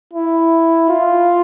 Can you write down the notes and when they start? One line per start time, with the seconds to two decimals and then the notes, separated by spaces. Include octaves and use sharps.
0.13 E4
0.89 F4